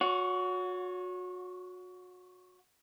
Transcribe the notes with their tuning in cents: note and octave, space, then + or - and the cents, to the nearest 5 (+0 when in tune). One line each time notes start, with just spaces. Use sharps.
F#4 -30 C#5 +25 F#5 -15